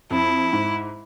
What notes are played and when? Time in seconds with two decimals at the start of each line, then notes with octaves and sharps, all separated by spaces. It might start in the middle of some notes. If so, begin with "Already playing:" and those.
0.11 F2 E4
0.52 G#2